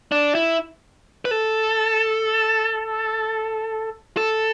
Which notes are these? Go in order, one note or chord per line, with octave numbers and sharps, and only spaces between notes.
D4
E4
B4
A4
A4